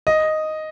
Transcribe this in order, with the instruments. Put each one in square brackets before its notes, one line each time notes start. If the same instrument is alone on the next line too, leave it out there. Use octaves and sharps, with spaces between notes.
[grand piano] D#5